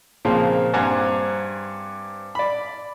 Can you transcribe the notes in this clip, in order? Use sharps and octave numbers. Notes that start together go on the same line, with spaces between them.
A#2 C#3 F3 A#3 C4
G2 C4 F#5 G#5 A#5
D5 B5